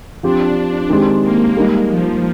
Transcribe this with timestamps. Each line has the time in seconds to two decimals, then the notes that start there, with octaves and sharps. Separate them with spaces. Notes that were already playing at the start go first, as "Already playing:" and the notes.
0.23 F3 C4 D4 G4
0.90 D#3 G#3 C4 G4
1.23 A#3
1.56 G3 G#3 A#3 D#4
1.89 F3